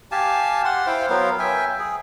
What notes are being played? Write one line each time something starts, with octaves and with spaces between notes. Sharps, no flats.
G4 F5 G#5 A5
F#5 C6
E4 C5 F5 G5
F#3 B3 A#4 F5
E5 G5 G#5
G#4